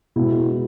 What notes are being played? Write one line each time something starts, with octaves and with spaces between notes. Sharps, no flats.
B2 G#3 E4
E4